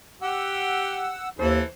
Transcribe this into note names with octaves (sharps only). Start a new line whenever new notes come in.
G4 F#5 E6
D#2 E3 A4 C5